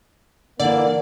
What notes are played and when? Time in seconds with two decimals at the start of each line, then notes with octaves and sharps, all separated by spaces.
0.60 D3 E3 A#3 D5